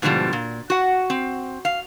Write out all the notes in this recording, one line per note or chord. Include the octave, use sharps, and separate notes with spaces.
G#2 B2 D3 E3 F3 G3
A#2
F#4 F#5
C4
F5